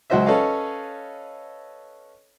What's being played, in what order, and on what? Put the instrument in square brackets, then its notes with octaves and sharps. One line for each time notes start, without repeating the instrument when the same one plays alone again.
[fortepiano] C#2 F#3 F#4 C5 D#5 E5
C#4 A4 B4 C#5 D#5 F5